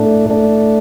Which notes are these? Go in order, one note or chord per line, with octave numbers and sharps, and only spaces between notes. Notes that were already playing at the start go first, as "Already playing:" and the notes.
Already playing: A2 A3 D4
A2 A3 D4